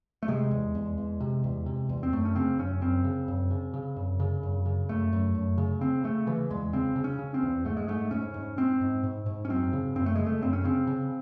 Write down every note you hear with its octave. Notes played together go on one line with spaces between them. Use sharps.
A3
C3 G#3
E2
E2
E2
C3
E2
C3
E2
C4
F#2 A3
C#4
C#3 C4
F#2 C#4
F#2 C4
C#3
F#2
C#3
C#3
F#2
C#3
F#2
C#3
F#2 A3
F#2
F#2
C#3
C#3 C4
C#3 A3
C#3 E3
E2 G#3
C#3 C4
C#3
C#4
C#3
C4
E2
G#2 A3
G#3
G#2 A3
G#2 C#4
G#2
G#2 C4
G#2
G#2
G#2
C#4
F#2 C4
C#3
F#2 C4
A3
C#3 G#3
A3
F#2 C4
C#4
C#3 C4
C#3